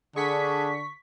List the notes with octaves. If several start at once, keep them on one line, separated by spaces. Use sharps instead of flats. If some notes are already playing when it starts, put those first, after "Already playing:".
D3 D4 G#4 C#6 B6